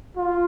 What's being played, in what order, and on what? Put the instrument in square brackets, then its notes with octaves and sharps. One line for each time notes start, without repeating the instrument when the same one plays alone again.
[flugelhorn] F4